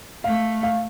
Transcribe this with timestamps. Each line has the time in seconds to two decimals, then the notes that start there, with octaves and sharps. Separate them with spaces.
0.24 A3 F5
0.63 F5